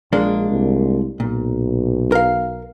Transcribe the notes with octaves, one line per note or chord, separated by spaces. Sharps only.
A#1 G#3 A#3 D4
C2
B1 A#2
A#4 F5